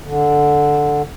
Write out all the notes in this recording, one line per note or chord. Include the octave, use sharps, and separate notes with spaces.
D3